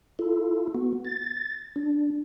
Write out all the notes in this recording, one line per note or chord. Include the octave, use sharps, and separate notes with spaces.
E4 F4 A4
B3 F#4
A6
D4